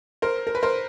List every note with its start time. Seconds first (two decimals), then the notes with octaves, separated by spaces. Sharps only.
0.22 A#4 C5
0.47 A#4
0.55 B4
0.63 A#4 C5